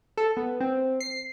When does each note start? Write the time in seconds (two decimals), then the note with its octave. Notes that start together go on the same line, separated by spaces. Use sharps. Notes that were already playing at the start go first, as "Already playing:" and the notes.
0.18 A4
0.37 B3
0.61 C4
1.00 C7